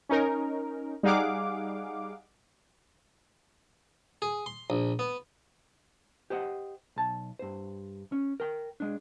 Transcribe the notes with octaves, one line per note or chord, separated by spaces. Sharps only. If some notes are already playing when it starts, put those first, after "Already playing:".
C#4 D#4 A#4
G3 D#4 G#4 F5 F#5 D6
G#4
C6
A#1
B3
G4 C5 D#5 F#5
B1 A5
G2 C5
C#4
A#4 G5
G#3 D4